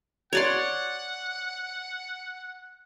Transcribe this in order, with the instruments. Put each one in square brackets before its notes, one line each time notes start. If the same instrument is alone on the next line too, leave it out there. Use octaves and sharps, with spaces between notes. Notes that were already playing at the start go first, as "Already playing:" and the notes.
[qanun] C#5 D5 C6 [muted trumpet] F#5